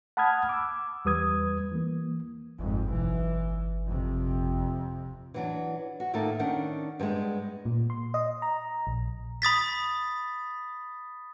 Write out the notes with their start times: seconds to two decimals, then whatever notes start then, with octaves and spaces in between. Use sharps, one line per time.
0.17 F#5 A5 B5 D#6 F6 G#6
0.49 D6 E6
1.05 E2 G3 B4 D#6 G#6
1.72 E3 A#3
2.59 G1 F2 G#2
2.90 B1 E3
3.87 F2 C3
5.34 E3 F#3 D4
6.00 F#4
6.14 A2 D#3 A#3 D#4 A5
6.39 D#3 C#4 D4 F#5
7.00 G2 F3 G3 G#3 B3
7.65 A#2
7.90 C6
8.14 D#5
8.42 A#5
8.87 A#1
9.42 B5 D#6 A6 B6